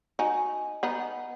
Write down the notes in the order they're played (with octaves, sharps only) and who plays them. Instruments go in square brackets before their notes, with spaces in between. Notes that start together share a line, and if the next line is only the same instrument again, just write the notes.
[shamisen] D#4 F#4 [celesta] G#5
[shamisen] B3 D#4 [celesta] F#5